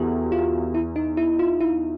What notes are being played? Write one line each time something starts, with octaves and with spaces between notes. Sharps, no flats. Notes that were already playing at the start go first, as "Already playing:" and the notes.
Already playing: E2 F#4 G4 A4
F4
E4
D#4
E4
F4
E4